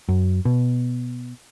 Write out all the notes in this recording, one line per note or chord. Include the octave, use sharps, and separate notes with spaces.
F#2
B2